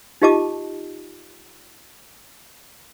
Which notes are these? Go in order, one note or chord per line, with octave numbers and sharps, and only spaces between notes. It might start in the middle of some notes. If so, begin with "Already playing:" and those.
D#4 F4 G4 D#5 A5 D6